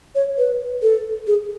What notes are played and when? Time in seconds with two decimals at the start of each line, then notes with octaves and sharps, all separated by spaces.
0.15 C#5
0.38 B4
0.82 A4
1.27 G#4